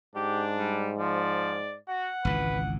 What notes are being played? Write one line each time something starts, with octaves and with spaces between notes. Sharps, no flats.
G#2 D4 G4
G3
F3 D5
F#4 F#5
G#1 C#2 E3 B4